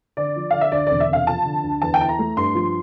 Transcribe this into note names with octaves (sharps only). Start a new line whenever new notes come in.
D3 D5
F3
D3 F5
E5
D2 D5
E1 D5
E5
C3 F5
F3 A5
D3
D2
E2 A5
G5
E4 A5
A#5
A3
G2 C6
F3